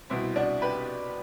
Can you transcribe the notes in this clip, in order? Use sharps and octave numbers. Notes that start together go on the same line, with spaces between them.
C2 B2 C4 E4
D4 F#4
G4 B4